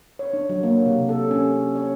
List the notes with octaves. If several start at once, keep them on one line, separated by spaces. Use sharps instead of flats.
C#5
D4
F#3
A#3
C3
A4
C#4
C#5